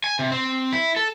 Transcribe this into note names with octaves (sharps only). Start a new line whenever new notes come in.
G#5
C3
C4
E4
A4